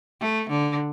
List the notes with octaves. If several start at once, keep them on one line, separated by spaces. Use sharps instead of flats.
A3
D3